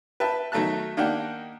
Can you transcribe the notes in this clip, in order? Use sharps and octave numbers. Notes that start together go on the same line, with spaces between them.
B4 E5 G5 A5
D#3 F#3 A3 E5 A5 F#6
D#3 A#3 D4 G4 F#5 G5